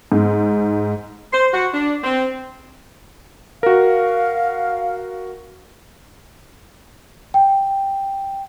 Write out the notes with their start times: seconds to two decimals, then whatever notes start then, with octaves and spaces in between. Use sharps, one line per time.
0.12 G#2
1.33 C5
1.53 F#4
1.74 D4
2.03 C4
3.63 F#4 A#4 F5
7.34 G5